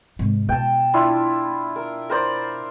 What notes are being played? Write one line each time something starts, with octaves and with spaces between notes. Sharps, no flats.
G#2 C3
B2 G5 A5
D4 E4 F4
A#4
A#4 C5 D5